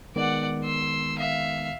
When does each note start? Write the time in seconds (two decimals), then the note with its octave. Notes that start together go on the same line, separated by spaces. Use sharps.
0.16 D#3 G#3 B3 D5 F#5
0.63 C6 E6
1.19 E5 F5